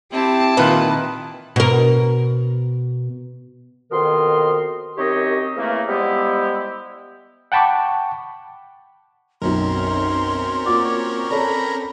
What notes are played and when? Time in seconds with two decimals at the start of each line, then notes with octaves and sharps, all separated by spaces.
0.13 C4 E4 G4 A5
0.57 A#2 D#3 F4 B4
1.56 B2 A#4
3.92 F2 B2 D#3 A#4 D#5 C6
4.97 F#2 D#3 C4 G4 C#5 D#5
5.56 C#3 E3 A3 A#3
5.88 F3 G3 G#3 B3 E4 G4
7.52 F#5 G5 A5 B5 C#6 D6
9.42 B1 F#2 C4 C#4 A#4 C6
10.66 A#3 F4 F#4 D5
10.84 C#5
11.30 A4 C#5 D5 A#5 B5